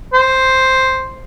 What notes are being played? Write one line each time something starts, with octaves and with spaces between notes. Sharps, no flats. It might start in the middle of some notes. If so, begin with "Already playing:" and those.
C5